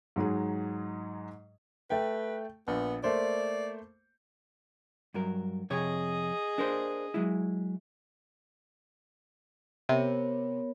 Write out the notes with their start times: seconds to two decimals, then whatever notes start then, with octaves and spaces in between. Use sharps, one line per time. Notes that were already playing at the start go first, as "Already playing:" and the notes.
0.16 G#2 F#3 D#4 G#4
1.90 A3 B4 G5
2.68 A#1 B3
3.04 A3 A#3 C5 D5
5.14 G2 F#3 A#4
5.70 F2 C3 G#4 C#5 D#5
6.58 D4 A#4 C5
7.14 F#3 G#3 E4
9.89 C3 B3 A#4 C#5